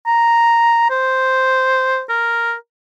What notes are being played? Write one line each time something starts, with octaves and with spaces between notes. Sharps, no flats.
A#5
C5
A#4